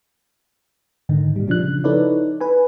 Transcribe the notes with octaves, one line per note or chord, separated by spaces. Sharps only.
G#2 D3 D#3 D#4
A#2 G3
C#3 F3 D4 F#6
D#4 E4 A4 B4 C#5 D5
B4 G#5